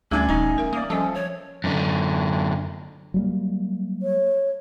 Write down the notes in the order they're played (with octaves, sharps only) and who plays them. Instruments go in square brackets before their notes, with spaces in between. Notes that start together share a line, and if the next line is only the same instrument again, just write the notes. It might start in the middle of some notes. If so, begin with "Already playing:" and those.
[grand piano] D1 D4 G#6 [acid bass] D2 [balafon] G3 A3 G#4 [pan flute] C#4
[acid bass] D#1 [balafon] E3 A#5 [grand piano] D#4
[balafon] A#4 E5
[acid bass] A#3 [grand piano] D5 D#6
[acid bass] F3 [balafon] G3 D#5 [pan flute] C#4 [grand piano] A4
[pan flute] C#5
[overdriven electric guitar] F#2 D3
[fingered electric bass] F#3 G3 A#3
[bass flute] C#5